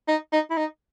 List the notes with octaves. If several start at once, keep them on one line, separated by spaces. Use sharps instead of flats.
D#4
D#4
E4
D#4